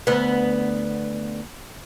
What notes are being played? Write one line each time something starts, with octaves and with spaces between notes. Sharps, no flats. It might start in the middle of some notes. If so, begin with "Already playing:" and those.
D2 B3